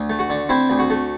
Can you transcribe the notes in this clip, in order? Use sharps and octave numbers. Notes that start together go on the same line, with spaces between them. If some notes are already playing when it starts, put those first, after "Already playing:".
Already playing: D2
A3
F#4
D3
C4 E4
D2
F#4
A3